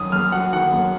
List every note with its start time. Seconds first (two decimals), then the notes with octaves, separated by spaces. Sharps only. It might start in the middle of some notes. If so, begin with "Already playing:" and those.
Already playing: F#2 D#3 D#6
0.12 F#2 F6
0.32 F#3 F#5
0.52 D#3 F#5
0.73 F#2